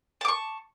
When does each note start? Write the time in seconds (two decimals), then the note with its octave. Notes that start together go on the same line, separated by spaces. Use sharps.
0.21 A5
0.25 D6
0.28 C#6